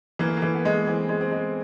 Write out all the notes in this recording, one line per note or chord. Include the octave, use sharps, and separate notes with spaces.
E3 A#3
A3
A#3
E3
B3
G#3
E3 C4
G#3
C4
G#3